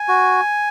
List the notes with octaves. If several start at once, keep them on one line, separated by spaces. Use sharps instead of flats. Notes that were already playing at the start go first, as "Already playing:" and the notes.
Already playing: G#5
F#4